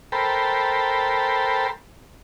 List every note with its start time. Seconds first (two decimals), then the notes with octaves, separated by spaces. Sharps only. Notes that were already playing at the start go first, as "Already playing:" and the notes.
0.12 A4 A#4 C5 G5 B5